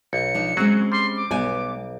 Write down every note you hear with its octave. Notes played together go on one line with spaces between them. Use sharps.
B1 C#7
F3 D4 D#4
F#3 G#3 C4 C#4 F#4 G#4
G3 C6
D6
B1 G3 B3 G#5